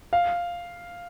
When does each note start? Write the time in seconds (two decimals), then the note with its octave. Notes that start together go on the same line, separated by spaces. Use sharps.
0.13 F5